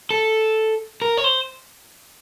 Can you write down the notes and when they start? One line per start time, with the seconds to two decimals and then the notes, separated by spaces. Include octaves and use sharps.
0.10 A4
1.02 A#4
1.17 C#5
1.24 C5